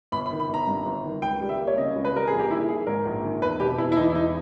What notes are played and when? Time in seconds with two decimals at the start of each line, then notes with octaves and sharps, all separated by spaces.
0.12 G1 B5
0.26 B5
0.31 D#3
0.40 B5
0.49 G1 A#5
0.67 G2
0.86 G1
1.04 D#3
1.22 C#2 G5
1.41 G3
1.49 E5
1.59 A#3
1.67 C#5
1.77 C#3 D#5
1.95 C#2
2.05 B4
2.13 G3 A#4
2.27 A#1 G#4
2.39 G4
2.50 D#3 E4
2.69 A#3 G#4
2.87 G#2 A#4
3.05 A#1
3.24 D#3
3.42 E1 B4
3.60 B2 G4
3.78 E1 E4
3.92 E4
3.97 E2 D#4
4.10 E4
4.15 E1 D#4